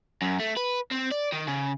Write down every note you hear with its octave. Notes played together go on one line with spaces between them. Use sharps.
F#2
A3
B4
C4
D5
D#3
C#3